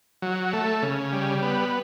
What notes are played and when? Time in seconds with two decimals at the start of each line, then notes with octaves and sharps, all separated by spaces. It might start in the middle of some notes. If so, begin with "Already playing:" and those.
0.22 F#3
0.53 A3
0.83 C#3
1.13 G3
1.42 B3